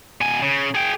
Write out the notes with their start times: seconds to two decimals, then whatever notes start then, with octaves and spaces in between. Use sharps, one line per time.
0.21 B2 G#5
0.42 C#3
0.75 G#4 G5